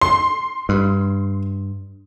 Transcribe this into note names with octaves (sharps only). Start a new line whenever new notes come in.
C6
G2